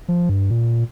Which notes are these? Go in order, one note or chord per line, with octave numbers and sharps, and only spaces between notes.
F3
G2
A#2